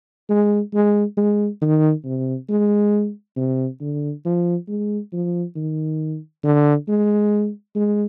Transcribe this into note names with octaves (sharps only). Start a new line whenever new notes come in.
G#3
G#3
G#3
D#3
C3
G#3
C3
D3
F3
G#3
F3
D#3
D3
G#3
G#3